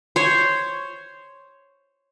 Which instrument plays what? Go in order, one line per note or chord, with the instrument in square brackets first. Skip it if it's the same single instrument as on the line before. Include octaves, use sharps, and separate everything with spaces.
[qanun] C5 C#5